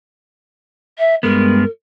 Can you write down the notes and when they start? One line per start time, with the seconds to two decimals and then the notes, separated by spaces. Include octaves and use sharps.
0.98 E5
1.23 G2 G#3 B3 A#4